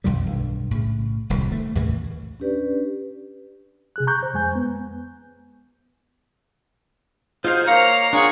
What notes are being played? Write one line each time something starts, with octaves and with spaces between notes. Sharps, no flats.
B1 F2 D#3 G3
B1 G2
A2 C#3
D1 C2 F2 D#3
A3
D#2 A2 C#3 E3
C#4 D4 G4 B4 D5
C3 G#4 F#6
A#5 C#6 F#6 G6
C5
F2 G#3 G#5 G6
B3
D#4 F4 F#4 G#4 C5 F5
A#3 C#5 F5 A#5
D4 F4 G#4 C#5 F#5